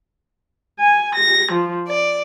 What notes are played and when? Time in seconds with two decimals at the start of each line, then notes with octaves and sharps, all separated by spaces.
0.82 G#5
1.17 A#6
1.52 F3
1.87 D5